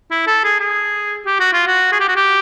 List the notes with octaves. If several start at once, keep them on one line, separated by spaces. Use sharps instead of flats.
E4
A4
G#4
G#4
G4
F#4
F4
F#4
G#4
G4
F#4
G4